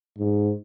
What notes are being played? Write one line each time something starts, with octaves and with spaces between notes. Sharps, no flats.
G#2